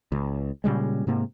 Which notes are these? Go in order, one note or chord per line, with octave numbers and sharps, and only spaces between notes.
C#2
A#2 C#3 G3 G#3
G#2 C3 A#3 C4